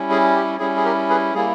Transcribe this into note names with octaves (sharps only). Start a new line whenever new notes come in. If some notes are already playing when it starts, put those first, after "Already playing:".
Already playing: G3 C#4 E4
G#4
G4
G3 C#4 E4 G#4
G#4
G4 A#4
G#4 B4
G3 A#3 E4 G#4